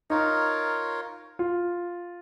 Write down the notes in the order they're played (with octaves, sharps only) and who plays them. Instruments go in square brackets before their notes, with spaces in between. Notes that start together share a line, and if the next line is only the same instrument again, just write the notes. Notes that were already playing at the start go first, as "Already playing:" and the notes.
[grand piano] D#4 [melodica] F4 A#4 C#5
[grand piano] F4